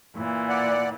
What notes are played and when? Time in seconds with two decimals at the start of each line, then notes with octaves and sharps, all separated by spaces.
0.16 A#2 E3
0.49 D5 F#5